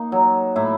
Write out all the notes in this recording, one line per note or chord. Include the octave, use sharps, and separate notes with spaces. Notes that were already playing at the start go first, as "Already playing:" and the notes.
Already playing: A#3 D#4
F#3
A2 E4